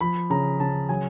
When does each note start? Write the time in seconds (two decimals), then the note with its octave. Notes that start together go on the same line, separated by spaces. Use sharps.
0.01 F3 B5
0.30 C#3 A#5
0.60 C#3 A5
0.89 F#3 G#5